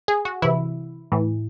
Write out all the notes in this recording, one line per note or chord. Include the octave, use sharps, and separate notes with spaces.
G#4
F#4
C3 E3 E4
A2 E3